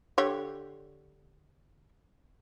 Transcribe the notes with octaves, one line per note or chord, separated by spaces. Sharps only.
D3 G4 C#5